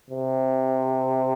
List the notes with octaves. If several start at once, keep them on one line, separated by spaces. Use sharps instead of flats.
C3